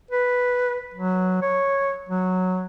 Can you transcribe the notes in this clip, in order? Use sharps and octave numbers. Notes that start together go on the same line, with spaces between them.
B4
F#3
C#5
F#3